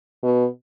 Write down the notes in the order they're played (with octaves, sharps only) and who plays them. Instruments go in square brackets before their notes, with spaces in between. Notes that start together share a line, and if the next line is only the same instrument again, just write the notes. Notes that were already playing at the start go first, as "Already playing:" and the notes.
[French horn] B2